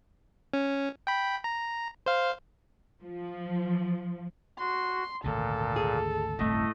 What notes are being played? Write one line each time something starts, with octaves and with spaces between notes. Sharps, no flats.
C#4
G5 B5
A#5
C5 F5
F3
F#4 C6
G#1 D2 A#2 C#3 A4
G#4
G1 C2 F#2 A2 A3 D#5